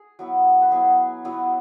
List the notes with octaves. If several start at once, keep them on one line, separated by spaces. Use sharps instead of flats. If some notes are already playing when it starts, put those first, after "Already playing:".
Already playing: G#4
F#3 B3 E4
B4
F#3 B3 E4 G#4
F#3 B3 E4